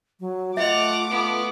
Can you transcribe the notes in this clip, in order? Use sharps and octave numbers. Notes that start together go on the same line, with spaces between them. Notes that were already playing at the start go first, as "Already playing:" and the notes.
F#3
A3 F4 D#5 E5 F#5 D6 F7
B3 F4